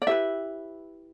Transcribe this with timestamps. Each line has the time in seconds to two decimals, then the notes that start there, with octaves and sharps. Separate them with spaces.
0.02 D5
0.07 E4 G4 B4 E5